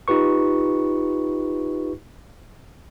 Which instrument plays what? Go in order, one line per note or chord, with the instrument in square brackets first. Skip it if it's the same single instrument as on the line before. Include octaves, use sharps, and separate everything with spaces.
[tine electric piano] D#4 F4 G4 B4 C#6